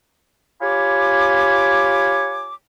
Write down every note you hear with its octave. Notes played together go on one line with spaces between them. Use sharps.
F4 G4 C#5 G#5 B5 D6